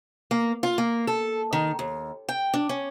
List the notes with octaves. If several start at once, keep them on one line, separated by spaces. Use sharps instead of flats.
A#3
F4
A#3
A4
D#3
D#2
G5
D4
C#4